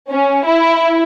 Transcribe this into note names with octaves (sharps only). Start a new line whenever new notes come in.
C#4
E4